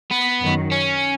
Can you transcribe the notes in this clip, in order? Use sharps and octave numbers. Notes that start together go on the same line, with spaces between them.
B3
F#2 D#3 F#3
C#4